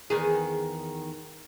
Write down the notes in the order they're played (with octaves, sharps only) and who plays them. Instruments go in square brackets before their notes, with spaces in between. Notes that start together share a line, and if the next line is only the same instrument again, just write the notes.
[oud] E2 D#3 G#4